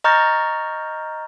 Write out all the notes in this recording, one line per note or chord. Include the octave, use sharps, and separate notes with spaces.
D#5 A#5 C#6 F6 G6 A6